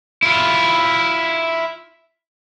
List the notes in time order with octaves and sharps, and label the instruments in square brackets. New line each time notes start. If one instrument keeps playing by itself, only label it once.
[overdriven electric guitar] E4 F4